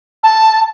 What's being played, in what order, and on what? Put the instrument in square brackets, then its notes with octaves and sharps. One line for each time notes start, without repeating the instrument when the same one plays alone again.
[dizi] A5